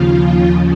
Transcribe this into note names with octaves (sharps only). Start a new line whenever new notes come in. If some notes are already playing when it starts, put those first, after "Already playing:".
Already playing: D#2 C#3 F3 F4